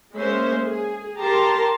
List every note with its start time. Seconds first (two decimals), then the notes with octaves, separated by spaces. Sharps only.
0.15 G#3 A#3 C#4 C5 E5
0.66 G#4
1.18 G4 A#4 A5 A#5 C6